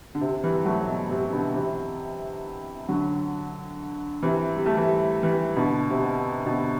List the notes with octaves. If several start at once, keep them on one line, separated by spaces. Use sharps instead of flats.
D3
C3
E3 G3
F#3 A3
B2
C3
B2 D3
C3 E3
D3 F#3
C3 E3
G3
A3
E3 G3
E3 G3
B2 D3
C3
B2 D3